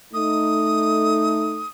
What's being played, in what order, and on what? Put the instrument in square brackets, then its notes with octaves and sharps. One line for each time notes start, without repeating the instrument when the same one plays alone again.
[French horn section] A3 D#4 [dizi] D#6